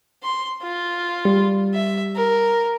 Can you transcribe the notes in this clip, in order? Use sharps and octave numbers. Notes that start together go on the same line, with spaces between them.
C6
F4
G3
E5
A#4